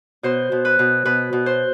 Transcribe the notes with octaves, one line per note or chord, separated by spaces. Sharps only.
B2 C5
B2
B4
B2
B2 B4
B2
C5